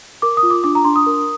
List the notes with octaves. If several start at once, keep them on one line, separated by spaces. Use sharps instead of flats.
A#4 D6
D#6
F4
D6
D4 D6
A#5
D4 C6
D#6
A#4